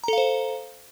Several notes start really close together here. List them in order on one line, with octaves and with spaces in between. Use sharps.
A#5 A4 F5 C5